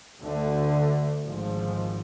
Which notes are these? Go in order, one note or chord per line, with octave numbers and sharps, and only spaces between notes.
D2 D3 A3
G#1 G#2 F3